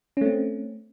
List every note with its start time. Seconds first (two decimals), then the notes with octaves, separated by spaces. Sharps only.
0.17 C#4
0.21 A3
0.26 C4